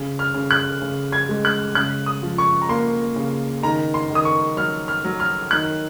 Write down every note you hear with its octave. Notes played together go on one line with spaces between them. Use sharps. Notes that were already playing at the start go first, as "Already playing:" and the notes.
Already playing: C#3
F6
C#3
F#6
C#3
G#6
G#3
F#6
C#3 F#6
D#6
F3
C#6
A#5
A#3 C6
C#3
D#3 A#5
C6
D#3
D#6
C#6
F#3 F6
F6
F#3
F6
D#3 F#6